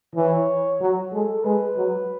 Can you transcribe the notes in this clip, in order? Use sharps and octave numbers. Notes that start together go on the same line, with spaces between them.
E3 C#5
F#3
G#3 A4
G#3 B4
F#3